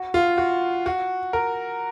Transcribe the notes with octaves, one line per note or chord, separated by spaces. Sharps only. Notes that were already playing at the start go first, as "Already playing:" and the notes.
Already playing: F#4
F4
F#4
F#4
A#4